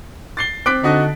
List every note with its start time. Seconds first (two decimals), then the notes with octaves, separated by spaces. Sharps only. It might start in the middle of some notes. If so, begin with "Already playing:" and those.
0.37 A6 C7 G7
0.66 C4 D6 F#6 B6 D7
0.83 D3 D4 D#4 F#4 D#5